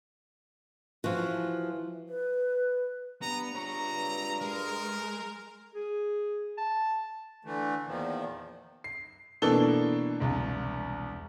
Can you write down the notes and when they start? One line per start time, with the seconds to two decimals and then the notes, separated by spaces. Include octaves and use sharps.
1.04 E3 F3 F#4
2.09 B4
3.22 G2 B3 A#5
3.55 F4 C#5 A#5
4.41 G#3 A#4
5.75 G#4
6.57 A5
7.45 D3 E3 A3
7.87 E2 A#2 D#3 F3
8.84 C7
9.42 B2 E3 A#3 D4 A4 G7
10.20 E1 C2